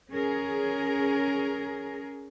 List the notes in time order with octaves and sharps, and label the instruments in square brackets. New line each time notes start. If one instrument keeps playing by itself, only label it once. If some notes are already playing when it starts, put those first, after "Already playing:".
[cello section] C#4 G#4 A#4